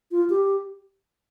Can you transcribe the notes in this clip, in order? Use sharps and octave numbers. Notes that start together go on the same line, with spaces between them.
F4
G4